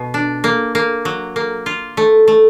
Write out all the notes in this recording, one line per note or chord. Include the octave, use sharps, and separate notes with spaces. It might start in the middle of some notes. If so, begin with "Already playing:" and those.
Already playing: B2
D4
A#3
A#3
F#3
A#3
F4
A3
A3